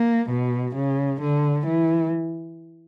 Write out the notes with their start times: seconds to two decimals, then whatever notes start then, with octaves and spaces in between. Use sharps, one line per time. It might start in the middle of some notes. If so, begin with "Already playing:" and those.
Already playing: A#3
0.30 B2
0.75 C#3
1.21 D3
1.66 E3